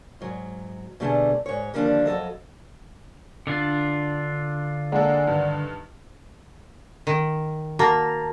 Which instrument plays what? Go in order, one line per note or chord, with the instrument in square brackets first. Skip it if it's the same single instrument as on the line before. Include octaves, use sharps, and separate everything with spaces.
[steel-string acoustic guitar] G#2 F#3
B2 D3 G3 A3 G#4 A5
G#2 C#5
D3 D#3 F3 G3 A#3 D4
F2 F#3 A4 D#5
[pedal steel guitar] D3 D4 F4
[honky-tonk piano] G#3 A#3 A4 [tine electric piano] D5 F#5 A#5
[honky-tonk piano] G2 D#3
[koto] D#3
[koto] A#3 [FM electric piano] F#4 A5 A#5